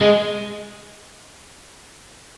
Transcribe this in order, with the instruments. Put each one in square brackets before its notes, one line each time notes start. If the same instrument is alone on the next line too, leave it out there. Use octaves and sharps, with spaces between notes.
[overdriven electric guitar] G#3